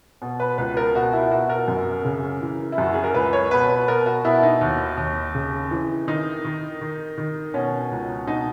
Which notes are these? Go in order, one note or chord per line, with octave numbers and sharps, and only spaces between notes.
B2
B4
C#2 B4
A#4
B2 F#4
E4
B2 F#4
A#4
F#2
C#3
E3
E4
F#2 F#4
G#4
A#4
C#2 B4
C#5
B2 B4
B4
B2 A#4
F#4
B2 E4
D#4
D#2
D#2
C#3
E3
D#3 D#4
D#3
D#3
D#3
B2 C#4
C#2
B2 D#4